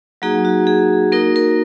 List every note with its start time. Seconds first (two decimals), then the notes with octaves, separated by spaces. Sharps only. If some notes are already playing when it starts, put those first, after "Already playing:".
0.22 F#3 A#3 D#4 F#4 G#4
0.45 F#4
0.67 G#4
1.12 A#3 D#4 F#4 A#4
1.36 A#4